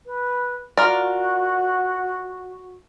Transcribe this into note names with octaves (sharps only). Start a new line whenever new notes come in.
B4
F4 F#4 A#4 D5